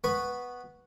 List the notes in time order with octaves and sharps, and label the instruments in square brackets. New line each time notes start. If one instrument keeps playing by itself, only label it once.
[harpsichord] B3 B4 B5 C#6